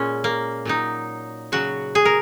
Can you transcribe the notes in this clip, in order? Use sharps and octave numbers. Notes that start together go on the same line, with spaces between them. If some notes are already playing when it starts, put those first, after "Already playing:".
Already playing: A#2 G#3 C#4
A#3
A#2 F#3 D#4
C#3 F#3 F#4
G#4
A#4